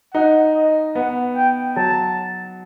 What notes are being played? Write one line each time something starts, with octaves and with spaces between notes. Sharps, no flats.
D#4 F#5
D#5
B3 F#5
G5
F#3 A5